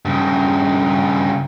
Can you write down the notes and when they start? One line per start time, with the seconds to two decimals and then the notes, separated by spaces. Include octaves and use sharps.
0.05 G2 C#3